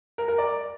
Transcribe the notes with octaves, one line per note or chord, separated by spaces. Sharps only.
A#4
A#4
D5